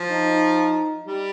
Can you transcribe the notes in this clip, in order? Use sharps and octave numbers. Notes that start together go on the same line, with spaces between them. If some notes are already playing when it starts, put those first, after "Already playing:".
Already playing: F3
D#4
G3